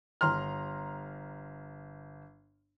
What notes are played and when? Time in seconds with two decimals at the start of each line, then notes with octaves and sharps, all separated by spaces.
0.21 G1 A#5 C6 F6